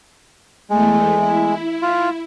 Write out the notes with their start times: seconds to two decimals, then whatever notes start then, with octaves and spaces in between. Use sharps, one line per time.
0.70 E2 G#3 A3
1.16 E4
1.82 F4